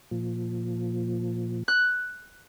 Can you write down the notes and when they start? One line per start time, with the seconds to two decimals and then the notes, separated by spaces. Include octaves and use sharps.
0.11 A#2 F3
1.68 F#6